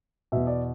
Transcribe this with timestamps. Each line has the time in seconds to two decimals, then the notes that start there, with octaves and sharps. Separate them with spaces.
0.32 E2 B2 E5
0.47 D5